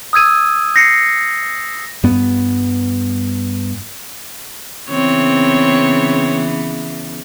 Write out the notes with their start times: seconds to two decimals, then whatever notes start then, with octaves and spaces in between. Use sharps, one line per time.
0.13 D#6 E6 G#6 D#7
0.75 G6 A#6 C7 C#7
2.04 G2 B3
4.90 C#3 E3 B3 C4 C#5